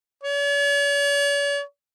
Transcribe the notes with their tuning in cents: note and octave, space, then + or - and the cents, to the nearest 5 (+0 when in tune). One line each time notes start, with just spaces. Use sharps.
C#5 +45